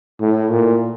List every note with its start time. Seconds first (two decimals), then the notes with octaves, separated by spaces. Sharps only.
0.20 A2
0.50 A#2